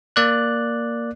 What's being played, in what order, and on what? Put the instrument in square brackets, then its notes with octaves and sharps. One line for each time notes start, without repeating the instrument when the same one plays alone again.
[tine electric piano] A#3 D5 F#6